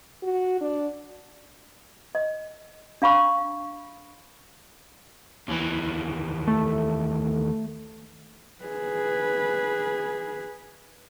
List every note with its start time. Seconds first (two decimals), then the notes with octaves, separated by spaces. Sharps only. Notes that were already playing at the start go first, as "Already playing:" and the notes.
0.23 F#4
0.61 D4
2.15 D#5
3.02 D4 F5 B5 C#6
5.48 D#2 E3
6.48 A3
8.65 G#4 B4